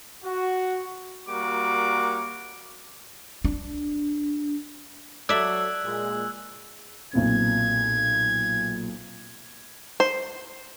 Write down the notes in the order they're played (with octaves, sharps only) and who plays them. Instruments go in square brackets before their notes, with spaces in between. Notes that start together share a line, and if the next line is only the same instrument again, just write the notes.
[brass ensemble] F#4
[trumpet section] G3 A#3 F#4 A#4 D6
[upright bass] D4
[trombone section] F#3 A4 [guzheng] D5 E5 [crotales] E6 F#6 G#6
[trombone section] A#2 G#3
[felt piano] B1 A#2 C4 [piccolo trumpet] G#6
[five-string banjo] C5